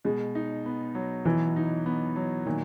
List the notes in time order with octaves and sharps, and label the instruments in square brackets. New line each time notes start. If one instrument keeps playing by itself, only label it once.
[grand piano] B2 [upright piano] G#3
[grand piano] D#4
B3
F#3
[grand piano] B2 [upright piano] E3
[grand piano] D#4
B3
F#3
[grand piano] A#2 [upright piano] D#3